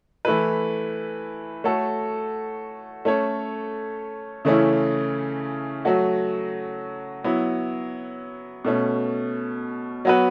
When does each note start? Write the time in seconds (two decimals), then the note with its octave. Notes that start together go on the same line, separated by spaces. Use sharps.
0.25 E3 A3 E4 B4
1.64 A3 F#4 A4 C#5
3.05 A3 C#4 A4 C#5
4.45 C#3 E3 A3 C#4 E4
5.85 F#3 A3 F#4
7.24 F#3 B3 E4
8.65 B2 A3 C#4
10.05 F#3 B3 F#4 B4